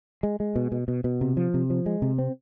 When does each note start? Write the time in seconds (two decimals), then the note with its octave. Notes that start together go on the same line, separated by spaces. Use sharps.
0.23 G#3
0.40 G#3
0.56 B2
0.72 B2
0.88 B2
1.04 B2
1.21 C3
1.37 F3
1.54 C3
1.70 F3
1.86 G#3
2.02 C3
2.18 C4